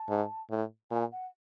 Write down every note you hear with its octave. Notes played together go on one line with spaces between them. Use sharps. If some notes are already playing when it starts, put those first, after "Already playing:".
Already playing: A5
G#2
A2
A#2 G#5
F#5